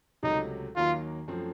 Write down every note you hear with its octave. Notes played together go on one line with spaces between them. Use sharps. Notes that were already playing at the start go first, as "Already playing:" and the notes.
C#2 C3 F#3 A3 D#4
D#2 D#3 F#3 A#3 F4
F#2 F3 A3 C4